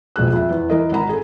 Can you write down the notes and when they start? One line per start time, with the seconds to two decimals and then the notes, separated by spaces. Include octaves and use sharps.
0.16 E1 A#1 G#4 F#6
0.33 F2 E5
0.50 E2
0.70 E3 A#4 D#5
0.91 G#1 F#5 A#5 B5
1.09 G#4 A4